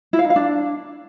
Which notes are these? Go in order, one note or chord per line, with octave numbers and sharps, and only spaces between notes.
E4
F5
D#4
F5
D4